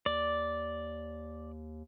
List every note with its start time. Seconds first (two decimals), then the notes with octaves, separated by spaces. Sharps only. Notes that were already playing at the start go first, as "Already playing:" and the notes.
0.06 D#2 D5